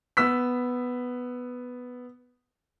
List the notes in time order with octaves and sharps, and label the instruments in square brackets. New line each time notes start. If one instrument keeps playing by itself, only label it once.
[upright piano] B3 E6 B6